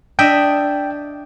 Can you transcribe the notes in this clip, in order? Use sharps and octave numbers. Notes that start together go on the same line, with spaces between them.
D4 D#5 E5 G5